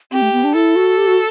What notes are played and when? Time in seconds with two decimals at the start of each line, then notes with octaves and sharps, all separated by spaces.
0.12 C4 G4
0.22 A3
0.33 B3
0.44 D4
0.54 E4 A4
0.76 F#4
0.98 G4
1.07 F#4